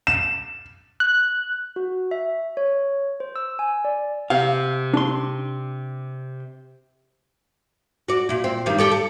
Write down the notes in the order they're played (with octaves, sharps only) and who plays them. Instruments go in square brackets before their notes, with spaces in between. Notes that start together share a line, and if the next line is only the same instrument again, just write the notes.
[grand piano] E7
[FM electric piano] F#6
[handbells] F#4
E5
C#5
C5
E6
G#5
D5
[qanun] C3 [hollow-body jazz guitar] F5
[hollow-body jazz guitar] D4 C6
[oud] F#4 D5
A#2 E4
C4
G2 D#3 G3
G4 A4 D5
A4